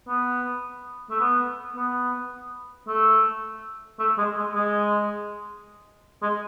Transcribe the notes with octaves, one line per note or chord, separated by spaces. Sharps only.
B3
A3
B3
B3
A3
A3
G#3
G#3
G#3
G#3